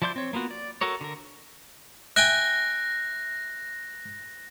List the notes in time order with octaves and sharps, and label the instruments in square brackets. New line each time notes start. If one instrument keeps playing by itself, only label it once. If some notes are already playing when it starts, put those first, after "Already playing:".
[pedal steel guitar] F3 E4 D5 C6 G6
C4 C#5
A#3 B3 F4 F#4
D5
F#4 A4 A#4 C#5
D3 A#4
[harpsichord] E5 G5 G#5 [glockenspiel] F#6 [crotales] A#6